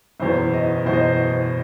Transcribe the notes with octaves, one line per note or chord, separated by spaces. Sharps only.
F#1 E2 B2 C5
D#5
F#1 E2 B2 C5
D#5
C5